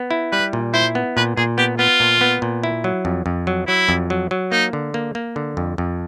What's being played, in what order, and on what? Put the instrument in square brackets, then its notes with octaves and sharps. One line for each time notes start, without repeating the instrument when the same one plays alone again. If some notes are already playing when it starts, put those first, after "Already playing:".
Already playing: [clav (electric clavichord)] B3
E4
[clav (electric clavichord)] G3 [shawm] B4
[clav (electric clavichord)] A#2
[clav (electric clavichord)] E4 [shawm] C5
[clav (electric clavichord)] B3
[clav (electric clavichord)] A#2 [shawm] B4
[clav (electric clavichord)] A#2 [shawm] G#4
[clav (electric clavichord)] B3 [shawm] G4
[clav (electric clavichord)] B3 [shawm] F4
[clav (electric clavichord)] A#2
B3
A#2
E4
F#3
F2
F2
F#3
[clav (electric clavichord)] F#3 [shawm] E4
[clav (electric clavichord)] F2
F#3
F#3
[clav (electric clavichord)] A#3 [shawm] D#4
[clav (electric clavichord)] D3
A#3
A#3
D3
F2
F2